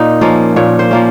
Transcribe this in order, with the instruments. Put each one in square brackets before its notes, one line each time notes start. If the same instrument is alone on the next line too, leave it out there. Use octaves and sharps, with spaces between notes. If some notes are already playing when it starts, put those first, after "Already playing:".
Already playing: [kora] A#2 D#4
F3 A#3 C#4
A#2 C#5
C5
F3 A#3 C#4